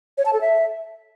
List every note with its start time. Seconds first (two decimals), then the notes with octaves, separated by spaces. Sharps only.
0.18 C#5
0.25 A5
0.33 A4
0.41 E5